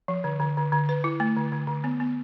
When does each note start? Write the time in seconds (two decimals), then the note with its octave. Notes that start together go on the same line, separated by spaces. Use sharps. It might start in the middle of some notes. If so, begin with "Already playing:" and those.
0.08 F3
0.24 D3
0.40 D3
0.57 D3
0.72 D3
0.89 B4
1.04 E4
1.20 A3
1.37 D3
1.52 D3
1.67 D3
1.84 B3
2.00 B3